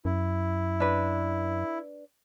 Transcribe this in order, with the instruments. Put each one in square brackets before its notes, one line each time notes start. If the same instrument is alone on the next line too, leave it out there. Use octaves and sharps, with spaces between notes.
[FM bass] F#2 [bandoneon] E4
[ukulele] D4 B4